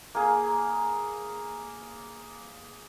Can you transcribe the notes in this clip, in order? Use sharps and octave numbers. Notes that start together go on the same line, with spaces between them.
A#3 G#4